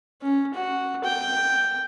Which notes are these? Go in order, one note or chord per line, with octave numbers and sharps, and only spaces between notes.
C#4
F#4
G5